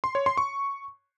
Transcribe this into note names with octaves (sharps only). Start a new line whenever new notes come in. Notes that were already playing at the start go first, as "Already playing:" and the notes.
C6
C#5
C6
C#6